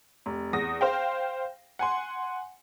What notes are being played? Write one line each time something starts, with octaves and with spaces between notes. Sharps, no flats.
F1
E2 D#6 A#6
C5 F5 G5
F#5 G#5 C6